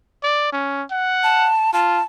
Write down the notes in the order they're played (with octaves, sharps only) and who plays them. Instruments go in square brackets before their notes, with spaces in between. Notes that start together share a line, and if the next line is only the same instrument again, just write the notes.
[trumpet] D5
C#4
F#5
[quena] A5
[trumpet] F4 [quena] A5